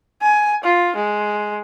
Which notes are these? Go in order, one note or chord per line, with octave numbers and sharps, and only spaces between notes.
G#5
F4
G#3